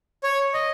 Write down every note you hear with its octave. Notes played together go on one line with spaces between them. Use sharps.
C#5
D#5